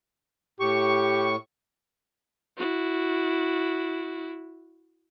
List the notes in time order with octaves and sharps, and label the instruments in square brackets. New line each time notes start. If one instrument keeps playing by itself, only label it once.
[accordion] A2 C#6 [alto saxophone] G4
[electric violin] E4 F#4